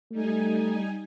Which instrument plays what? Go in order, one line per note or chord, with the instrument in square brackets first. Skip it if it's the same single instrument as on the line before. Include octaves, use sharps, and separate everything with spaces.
[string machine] G3 D#4 G#5 [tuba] A3